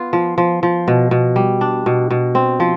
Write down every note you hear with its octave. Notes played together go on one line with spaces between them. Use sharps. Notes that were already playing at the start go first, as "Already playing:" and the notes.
Already playing: B3 F4
F3
F3
F3
B2
B2
G3
D4
B2
B2
C4
F3